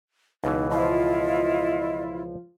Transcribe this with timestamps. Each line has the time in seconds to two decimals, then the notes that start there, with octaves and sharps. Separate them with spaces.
0.44 C#2 B2 E3 D#4
0.71 F3 E4 F4 D#5